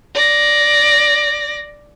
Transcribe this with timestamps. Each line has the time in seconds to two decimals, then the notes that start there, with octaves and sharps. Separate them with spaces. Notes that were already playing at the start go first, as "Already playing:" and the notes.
0.15 D5 A#6